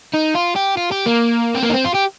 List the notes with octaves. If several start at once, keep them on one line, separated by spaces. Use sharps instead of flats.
D#4
F4
G4
F4
G4
A#3
C4
A#3
D#4
C4
F4
G4